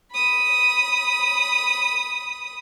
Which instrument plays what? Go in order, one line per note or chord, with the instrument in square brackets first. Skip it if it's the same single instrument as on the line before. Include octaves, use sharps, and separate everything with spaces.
[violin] B5 D#6